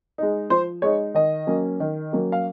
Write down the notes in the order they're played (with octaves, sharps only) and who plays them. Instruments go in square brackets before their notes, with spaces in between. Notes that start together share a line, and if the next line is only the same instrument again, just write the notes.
[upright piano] G#3 D#4
F3 C5
G#3 D#4 C#5
D#3 D#5
F#3 A#3 C#4
D#3
F#3 A#3 C#4
F5